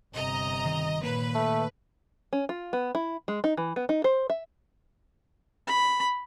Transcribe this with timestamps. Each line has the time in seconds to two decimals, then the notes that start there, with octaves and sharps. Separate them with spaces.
0.15 G1 C3 D#5 A#5
0.66 D#3
1.03 A#2 D#3 A#3 B4 C#5
1.35 A3
2.33 C#4
2.49 F4
2.73 B3
2.95 E4
3.28 G#3
3.44 D#4
3.57 E3
3.76 B3
3.89 D#4
4.04 C5
4.30 E5
5.67 B5